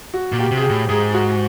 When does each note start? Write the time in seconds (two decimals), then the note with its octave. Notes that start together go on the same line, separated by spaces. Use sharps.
0.14 F#4
0.32 A#2
0.39 G4
0.51 C3
0.57 G#4
0.64 G4
0.70 A2
0.89 G#2 G#4
1.14 F#4